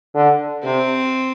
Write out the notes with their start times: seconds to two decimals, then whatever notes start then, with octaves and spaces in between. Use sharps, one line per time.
0.14 D3
0.63 C3 C4